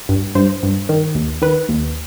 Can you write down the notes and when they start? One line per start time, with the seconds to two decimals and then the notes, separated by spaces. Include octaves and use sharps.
0.09 G2
0.35 G2 C5
0.63 G2
0.89 D#3
1.15 D#2
1.42 D#3 B4
1.69 D#2